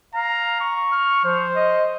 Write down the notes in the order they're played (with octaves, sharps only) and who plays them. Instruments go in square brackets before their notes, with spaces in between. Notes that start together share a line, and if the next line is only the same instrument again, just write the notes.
[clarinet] F5 [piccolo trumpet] A#5
[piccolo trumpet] C#6
[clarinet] F6
[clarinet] F3 [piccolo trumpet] C5
[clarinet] D#5